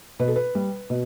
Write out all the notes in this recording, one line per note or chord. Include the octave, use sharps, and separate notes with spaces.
B2 B4
A4
B4
G3
B2